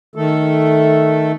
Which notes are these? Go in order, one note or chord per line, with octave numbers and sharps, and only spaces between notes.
D#3 A3 A4